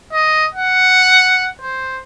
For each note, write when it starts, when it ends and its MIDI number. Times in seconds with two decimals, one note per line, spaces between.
0.12 0.45 75
0.55 1.50 78
1.60 2.00 72